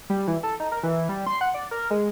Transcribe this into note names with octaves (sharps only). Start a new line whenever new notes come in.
G3
E3
A4
D#4
A#4
E3
G3
C6
F#5
D5
A#4
G#3